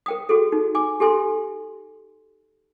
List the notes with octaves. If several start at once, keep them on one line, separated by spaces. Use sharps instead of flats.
A#4 G5 D#6
F#4 G#4 A4
D#4
G#5 D6
G4 A4 G#5 C6